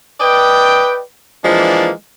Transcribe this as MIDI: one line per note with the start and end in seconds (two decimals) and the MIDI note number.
0.20 1.00 71
0.20 1.00 74
0.20 1.00 75
0.20 1.00 79
1.44 1.91 52
1.44 1.91 53
1.44 1.91 56
1.44 1.91 58
1.44 1.91 62